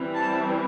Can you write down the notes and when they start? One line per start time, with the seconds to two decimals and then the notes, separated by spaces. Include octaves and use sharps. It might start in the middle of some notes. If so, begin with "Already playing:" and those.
Already playing: E3 G3 C4
0.15 A5